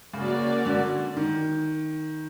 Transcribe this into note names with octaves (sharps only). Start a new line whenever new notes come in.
C#3 A#3 C#4 F#4 A#4 D5
D3
D#3